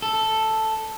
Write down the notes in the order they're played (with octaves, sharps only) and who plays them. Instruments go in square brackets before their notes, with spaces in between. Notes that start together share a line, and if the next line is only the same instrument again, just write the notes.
[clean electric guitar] A4